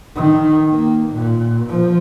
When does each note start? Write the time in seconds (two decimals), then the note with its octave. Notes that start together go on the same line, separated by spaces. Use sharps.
0.15 D#3
0.70 A#3
1.10 A#2
1.69 F3